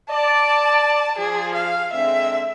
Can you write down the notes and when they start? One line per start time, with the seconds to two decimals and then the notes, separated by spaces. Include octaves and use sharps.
0.10 D5 A5
1.18 F3 G#4
1.55 F5
1.93 D3 G#3 C4 E5